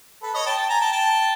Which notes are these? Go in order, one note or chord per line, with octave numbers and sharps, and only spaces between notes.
A4 B4
C#5 D#5
G5 A5
G5 A5
G#5 A#5
G5 A5
G5 A5